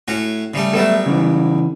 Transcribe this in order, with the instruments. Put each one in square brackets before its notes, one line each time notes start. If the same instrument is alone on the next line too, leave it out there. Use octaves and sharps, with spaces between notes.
[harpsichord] A2 C#4 F#4
C#3 G3 A3
[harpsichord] F#3 G3 B3 [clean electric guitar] A4 E5
[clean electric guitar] C#3 E3